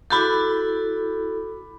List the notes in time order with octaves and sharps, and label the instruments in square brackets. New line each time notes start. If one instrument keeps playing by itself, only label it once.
[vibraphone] E4 F#4 A4 [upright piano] B5 D6 G6